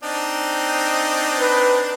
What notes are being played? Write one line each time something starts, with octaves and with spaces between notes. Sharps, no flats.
C4 D4 D#4
B4